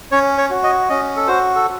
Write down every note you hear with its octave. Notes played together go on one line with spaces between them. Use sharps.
C#4 C#5
C#5
F#4
D#5
C#4 D#5
A4
F#4 C5
A4